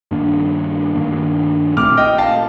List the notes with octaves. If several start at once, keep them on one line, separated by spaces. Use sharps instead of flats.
G2 D#3 A#3 D4
G2 D#3 A#3 D4
A#2 A3 C4 D6 F6
D#5 G5
F5 A5